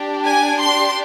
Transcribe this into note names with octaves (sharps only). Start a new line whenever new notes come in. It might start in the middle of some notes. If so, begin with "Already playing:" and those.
Already playing: D4 G4
G#5
C6